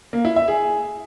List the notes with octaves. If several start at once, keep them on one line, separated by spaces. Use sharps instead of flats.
A#3
E4
E5
G#4